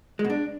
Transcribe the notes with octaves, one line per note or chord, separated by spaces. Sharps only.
G#3
B2
D4